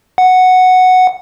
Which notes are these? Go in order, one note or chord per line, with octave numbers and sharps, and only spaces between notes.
F#5